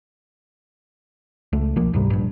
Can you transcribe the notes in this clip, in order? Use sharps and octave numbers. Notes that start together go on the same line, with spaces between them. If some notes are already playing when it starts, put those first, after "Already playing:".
C#2 A3
B1 F3 A#3
D2 G#2 C3 G3
A#1 G2